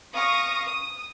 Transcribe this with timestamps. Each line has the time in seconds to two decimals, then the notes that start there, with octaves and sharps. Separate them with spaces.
0.13 F5 C#6 D#6 A#6
0.66 D#6